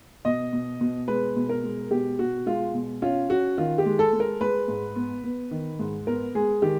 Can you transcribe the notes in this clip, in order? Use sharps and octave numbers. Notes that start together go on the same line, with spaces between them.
B2 D#5
B2
B2
G#3 B4
B2
A#4
G#3
B2 G4
B2 F#4
G#3 F4
B2
C#4 F4
C#4 F#4
D#3 F4
G4
G#3
A4
G#3
A#4
G#3 B4
G#2
B3
B3
D#3
G#2
B3 A#4
G#3 G#4
D#3 G4